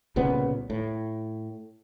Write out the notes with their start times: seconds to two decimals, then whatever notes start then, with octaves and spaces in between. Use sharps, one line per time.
0.16 C2 A#2 C#3 B3
0.70 A2